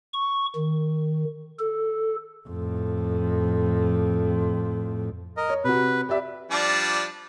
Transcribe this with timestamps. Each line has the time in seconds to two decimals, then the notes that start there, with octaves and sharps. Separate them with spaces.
0.14 C#6
0.56 D#3
1.59 A4
2.48 F2 A2
5.37 A#4 D#5
5.49 C#5
5.64 C3 F#4 B4
6.09 G4 D5 E5
6.51 F3 G3 D4